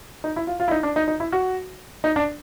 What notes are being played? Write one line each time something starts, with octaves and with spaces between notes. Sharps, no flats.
D#4
E4
F4
F4
E4
D#4
D4
D#4
D#4
E4
F#4
D#4
D4